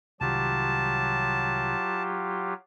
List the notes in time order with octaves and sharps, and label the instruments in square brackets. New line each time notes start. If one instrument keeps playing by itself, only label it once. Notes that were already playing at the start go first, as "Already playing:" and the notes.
[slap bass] C2 D#3 [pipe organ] F#3 F4 G4 [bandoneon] A5